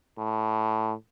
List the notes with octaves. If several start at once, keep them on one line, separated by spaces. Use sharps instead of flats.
A2